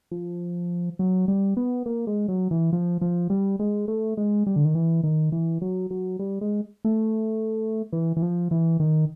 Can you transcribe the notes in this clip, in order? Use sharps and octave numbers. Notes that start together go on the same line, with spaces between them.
F3
F#3
G3
B3
A#3
G#3
F#3
E3
F3
F3
G3
G#3
A3
G#3
G3
D3
D#3
E3
D#3
E3
F#3
F#3
G3
G#3
A3
E3
E3
F3
E3
D#3